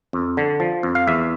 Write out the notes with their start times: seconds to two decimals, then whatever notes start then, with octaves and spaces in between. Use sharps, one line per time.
0.13 F2
0.37 D3
0.60 F3
0.83 F2
0.95 F5
1.08 E2 E5